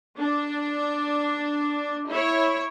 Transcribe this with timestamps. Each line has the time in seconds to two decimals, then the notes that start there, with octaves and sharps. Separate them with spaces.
0.19 D4
2.09 E4 C#5